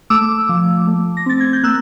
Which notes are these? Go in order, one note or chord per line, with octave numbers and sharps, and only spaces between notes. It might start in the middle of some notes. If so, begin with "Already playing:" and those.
A3 D6 E6
F3
A3
A#6
C4 A6
G#6
G6
A#3 E6 F#6